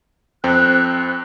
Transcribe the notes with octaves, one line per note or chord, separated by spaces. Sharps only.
F2 C4 G5 F#6